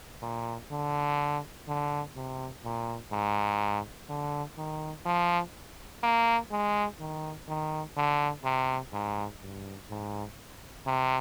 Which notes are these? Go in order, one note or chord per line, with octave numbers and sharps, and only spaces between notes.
A#2
D3
D3
C3
A#2
G#2
D3
D#3
F3
A#3
G#3
D#3
D#3
D3
C3
G#2
G2
G#2
C3